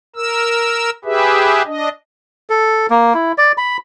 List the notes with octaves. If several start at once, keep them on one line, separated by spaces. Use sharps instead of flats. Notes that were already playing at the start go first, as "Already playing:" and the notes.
A#4 E6
G4 G#4 B4 E5
D4 D#5
A4
A#3
E4
D5
B5